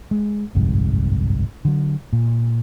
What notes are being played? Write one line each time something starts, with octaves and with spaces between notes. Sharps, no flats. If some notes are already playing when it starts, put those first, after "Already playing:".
G#3
G1 C2 F2 G#2
D3 F#3
A#2